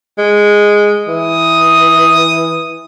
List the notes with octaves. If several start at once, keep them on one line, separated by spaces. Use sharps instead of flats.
G#3
E3 D#6